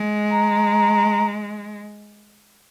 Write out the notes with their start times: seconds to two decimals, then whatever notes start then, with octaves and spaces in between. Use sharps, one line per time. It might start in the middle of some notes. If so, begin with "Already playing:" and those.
Already playing: G#3
0.31 A#5